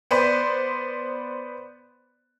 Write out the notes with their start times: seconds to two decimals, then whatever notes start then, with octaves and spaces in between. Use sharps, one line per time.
0.11 B3 B4 C5 D5